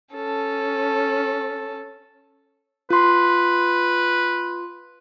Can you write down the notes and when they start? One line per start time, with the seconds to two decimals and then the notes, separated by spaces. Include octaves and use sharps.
0.15 C#4 A4
2.90 F4 B4 C6